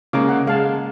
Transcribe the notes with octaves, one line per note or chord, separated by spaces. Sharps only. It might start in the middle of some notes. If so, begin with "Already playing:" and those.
C#3 G#3 A#3 C#4 F5 D6
F#5
G#3 F5 A5